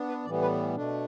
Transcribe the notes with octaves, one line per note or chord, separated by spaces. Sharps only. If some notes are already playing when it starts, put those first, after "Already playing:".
Already playing: B3 D4
B4
A2 E3 G3 B3 D5
B4
B2 A3 D4